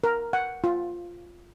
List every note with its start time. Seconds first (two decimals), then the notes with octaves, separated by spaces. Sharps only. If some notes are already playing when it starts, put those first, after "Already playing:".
0.04 A#4
0.33 F#5
0.64 F4